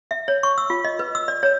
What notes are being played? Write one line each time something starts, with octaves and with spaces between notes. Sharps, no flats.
E5
C#5
C#6
E6
F4
D#5
B4
E6
D5
C#5